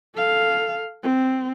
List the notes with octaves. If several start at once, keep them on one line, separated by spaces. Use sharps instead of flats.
A4 F5
C4